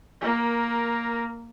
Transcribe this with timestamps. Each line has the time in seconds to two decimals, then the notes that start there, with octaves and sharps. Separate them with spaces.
0.21 A#3 A#4